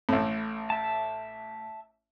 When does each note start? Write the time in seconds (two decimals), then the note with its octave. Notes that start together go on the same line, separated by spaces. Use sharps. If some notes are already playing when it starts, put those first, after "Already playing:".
0.09 A1 A2
0.70 E5 A5